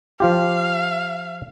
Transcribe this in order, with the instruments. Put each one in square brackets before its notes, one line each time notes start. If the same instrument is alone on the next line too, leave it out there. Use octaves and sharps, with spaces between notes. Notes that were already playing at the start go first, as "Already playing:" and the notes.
[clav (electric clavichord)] F3 F4 G4 [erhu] F5